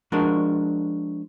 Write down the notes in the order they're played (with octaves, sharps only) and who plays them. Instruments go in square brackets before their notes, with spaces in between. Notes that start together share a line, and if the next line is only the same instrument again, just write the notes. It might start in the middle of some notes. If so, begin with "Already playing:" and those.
[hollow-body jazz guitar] F3 G#3 D4 F#4 A4 A#4